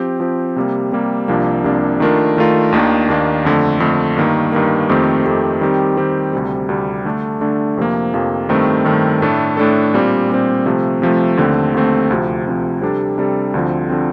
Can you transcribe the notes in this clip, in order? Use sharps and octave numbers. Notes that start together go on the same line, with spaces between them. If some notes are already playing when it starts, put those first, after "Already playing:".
Already playing: F3 C4 G4
F3 C4 G4
C3 G3 A#3
C3 G3 A#3
C2 C3 F3 A#3 D4
C2 C3 F3 A#3 D4
D#3 A3 D4 F4 A#4
D#3 A3 D4 F4 A#4
D#2 D#3 A#3 D4
D#2 D#3 A#3 D4
F2 D3 A3
F2 D3 A3
G2 D#3 A#3
G2 D#3 A#3
F2 D#3 A3 C4 G4
F2 D#3 A3 C4 G4
D#3 G3 C4 G4
D#3 G3 C4 G4
D2 C3 G3
D2 C3 G3
D3 A3 D4
D3 A3 D4
F2 C3 F3 A#3
F2 C3 F3 A#3
G2 D#3 A3 C4
G2 D#3 A3 C4
A2 A3 D4 A4
A2 A3 D4 A4
A#2 G3 C4
A#2 G3 C4
C3 F3 A3
C3 F3 A3
D#2 D3 A3 C4
D#2 D3 A3 C4
D2 C3 F3
D2 C3 F3
C3 G3 D4 A4
C3 G3 D4 A4
D2 D3 F3 C4
D3 F3 C4